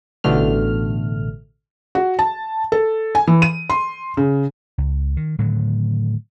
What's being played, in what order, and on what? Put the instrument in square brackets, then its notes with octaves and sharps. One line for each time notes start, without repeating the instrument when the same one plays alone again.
[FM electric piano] A1 B2 D3 A3 F6
[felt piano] F#4
A5
A4
G#5
E3
D#7
C6
C#3
[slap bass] C#2
D#3
A2 D3 D#3 F#3